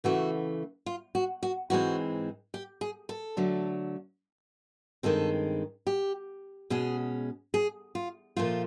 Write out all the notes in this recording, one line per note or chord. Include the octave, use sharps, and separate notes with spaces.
C#3 E3 A3 F#4
F4
F#4
F#4
G#2 E3 G#3 C4 F#4
G4
G#4
A4
D3 F#3 A3
G2 D#3 G#3 C4 A4
G4
B2 G#3 C#4 G#4
G#4
F4
A#2 F3 A3 F4